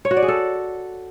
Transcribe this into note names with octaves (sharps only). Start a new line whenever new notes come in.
C#5
F#4
D5
G#4
A4